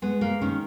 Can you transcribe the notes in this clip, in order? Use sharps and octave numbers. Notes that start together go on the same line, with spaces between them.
G#3 B3
A#3
D#3 C#4